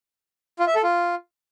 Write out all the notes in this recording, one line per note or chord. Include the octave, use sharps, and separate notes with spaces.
F4
E5
A4
F4